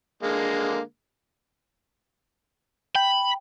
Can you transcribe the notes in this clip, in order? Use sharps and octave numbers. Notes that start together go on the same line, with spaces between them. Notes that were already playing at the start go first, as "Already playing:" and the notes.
D3 G#3 A#3
G5 B5